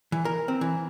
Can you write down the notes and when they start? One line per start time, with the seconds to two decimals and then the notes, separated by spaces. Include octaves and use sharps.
0.12 E3
0.25 A#4
0.48 C4
0.61 E3